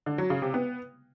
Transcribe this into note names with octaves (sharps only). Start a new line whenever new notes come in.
D3
F#3
C#3
C3
B3